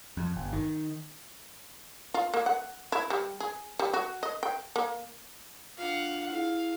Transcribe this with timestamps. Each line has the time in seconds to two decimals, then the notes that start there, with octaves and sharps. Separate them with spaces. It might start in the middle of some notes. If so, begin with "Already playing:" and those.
0.17 F2
0.36 G1
0.53 D#3
2.14 F4
2.34 A#3
2.46 F#5
2.92 E4
3.10 G3
3.40 G#4
3.79 G3
3.93 F#4
4.23 D#5
4.43 G5
4.76 A#3
5.78 D4 F4 F5 F#5
6.30 E4 G#4 F5